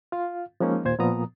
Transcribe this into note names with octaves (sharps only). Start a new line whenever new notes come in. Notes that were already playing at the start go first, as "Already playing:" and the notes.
F4 F5
F3 G#3 A#3 C#4 D#4
D#2 A#2 C5 G#6
A#2 F3 B3 A#5 D#6